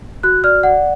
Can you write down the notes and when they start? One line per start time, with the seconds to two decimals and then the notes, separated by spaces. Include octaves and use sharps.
0.23 F#4 F#6
0.44 D5 F6
0.63 D5 F#5